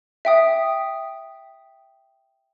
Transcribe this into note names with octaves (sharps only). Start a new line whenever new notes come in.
E5 G5 D#6